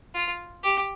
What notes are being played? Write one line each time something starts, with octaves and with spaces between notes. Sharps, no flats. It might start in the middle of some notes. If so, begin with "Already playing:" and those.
F4
G4